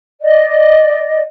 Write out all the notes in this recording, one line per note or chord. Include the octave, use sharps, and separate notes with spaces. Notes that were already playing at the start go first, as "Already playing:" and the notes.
D5 D#5